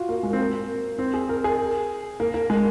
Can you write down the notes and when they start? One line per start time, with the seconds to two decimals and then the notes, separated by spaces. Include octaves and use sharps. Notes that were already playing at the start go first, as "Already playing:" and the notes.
Already playing: F4 F#4
0.09 A#3
0.23 G#3
0.33 C4
0.38 A#3
0.99 C4
1.14 G#4
1.29 A#4
1.44 G#4
2.20 A#3
2.34 A#3
2.50 G#3